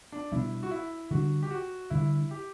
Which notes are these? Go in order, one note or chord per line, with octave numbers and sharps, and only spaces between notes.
D4
B2 G3 B3 D4 E4
F#4
E4
D3 G3 D4 F#4
G4
F#4
D3 G3 D4 E4
G4